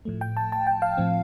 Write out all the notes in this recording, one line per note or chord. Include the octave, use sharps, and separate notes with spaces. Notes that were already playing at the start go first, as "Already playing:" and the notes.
A2 F3 A3
G5
A5
A5
G5
F5
A2 F3 C4